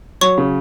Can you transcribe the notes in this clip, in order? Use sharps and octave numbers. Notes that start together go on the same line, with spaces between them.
F#3 C#5 C#6
C#3